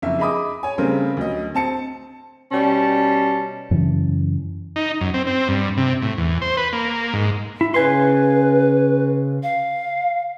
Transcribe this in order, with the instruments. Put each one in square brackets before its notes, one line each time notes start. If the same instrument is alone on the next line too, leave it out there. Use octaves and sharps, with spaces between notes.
[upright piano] F#1 F2 E5
G#4 D#5 B5 D6 D#6
C#5 G#5
C#3 G3 A3 C4 A#4 C5
D2 F#3 D#5
C4 A5 C#7
[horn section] B2 G3 C#4 A5
[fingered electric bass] F#2 C#3 E3 C#4
[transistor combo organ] D#4
F#2
C4
C4
G2
C3
A2
E2
C5
B4
A#3
G#2
[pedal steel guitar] E4
[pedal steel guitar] C#3 G#5 C6 [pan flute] B4
[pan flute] F5